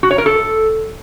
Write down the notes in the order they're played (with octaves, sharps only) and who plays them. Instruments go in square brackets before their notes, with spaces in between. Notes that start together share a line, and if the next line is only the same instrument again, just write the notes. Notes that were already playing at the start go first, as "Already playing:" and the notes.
[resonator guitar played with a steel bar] F#4
C#5
A#4
A4